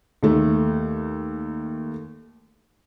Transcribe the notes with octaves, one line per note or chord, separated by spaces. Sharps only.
D#2 A3